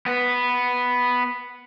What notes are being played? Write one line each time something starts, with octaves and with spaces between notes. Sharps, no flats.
B3 B4